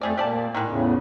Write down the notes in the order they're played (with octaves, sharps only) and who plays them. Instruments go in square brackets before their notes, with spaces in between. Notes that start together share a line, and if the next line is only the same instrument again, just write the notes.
[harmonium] F2 A3 [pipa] G3 G#4 D5
[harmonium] A#2 [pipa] G4 D5 A5
[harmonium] A2 [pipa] D#3 G3 G#3
[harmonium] E2 A2 C#3